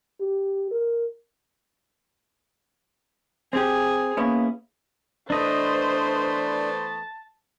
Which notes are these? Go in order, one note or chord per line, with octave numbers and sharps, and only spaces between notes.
G4
A#4
C4 G4 G#4
A#3 B3 C#4 E4
E3 A3 B3 D4 C5 D#5 A5